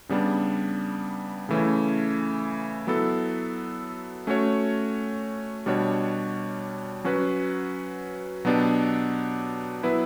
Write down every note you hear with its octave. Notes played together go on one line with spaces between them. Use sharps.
C#3 G3 B3 D4
C#3 E3 A3 C#4
F#3 B3 E4 A4
A3 C#4 F#4 C#5
B2 G3 D4 F#4 C#5
F#3 C#4 F#4 B4
B2 F#3 B3 D4 G4
F#3 B3 E4 B4